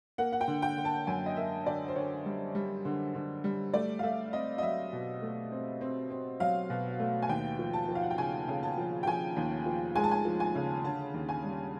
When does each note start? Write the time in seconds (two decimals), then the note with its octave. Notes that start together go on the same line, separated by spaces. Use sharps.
0.18 A#3 F#5
0.32 F#5
0.41 G5
0.48 D3
0.62 G5
0.78 D3
0.85 A5
1.07 F#2 G#5
1.26 D#5
1.37 A#3 E5
1.66 D3 D5
1.88 C5
1.96 D3 C#5
2.26 G3
2.55 G3
2.85 D3
3.15 D3
3.44 G3
3.74 A3 D5
3.99 F5
4.03 A3 E5
4.33 C4 D#5
4.58 D#5
4.63 F#3 E5
4.93 B2
5.22 A3
5.52 C4
5.81 C4
6.10 C4
6.40 F#3 F5
6.70 B2
7.00 A3
7.22 G#5
7.29 D#2 G5
7.59 F3
7.73 A5
7.89 F3
7.95 F5
8.03 F#5
8.10 G5
8.18 C#3 G#5
8.48 C#3
8.63 A5
8.78 F3
9.03 G5
9.07 F3 G#5
9.36 D#2
9.66 F3
9.96 G#3 G#5
10.04 A5
10.11 G#5
10.25 F3
10.40 G#5
10.55 C#3
10.84 D3 A5
11.14 D#2
11.29 G#5
11.44 G3